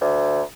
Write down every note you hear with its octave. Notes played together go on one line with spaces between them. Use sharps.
D2